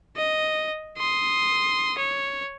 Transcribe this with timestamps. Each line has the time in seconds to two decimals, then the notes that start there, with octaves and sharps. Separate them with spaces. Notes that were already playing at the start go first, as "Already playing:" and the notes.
0.17 D#5
0.97 C6 D#6
1.98 C#5